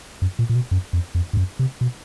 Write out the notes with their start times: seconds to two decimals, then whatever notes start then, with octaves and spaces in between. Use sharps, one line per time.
0.22 F#2
0.39 A#2
0.50 A#2
0.55 B2
0.71 F#2
0.93 F2
1.15 F2
1.33 G2
1.37 F#2
1.59 C3
1.81 B2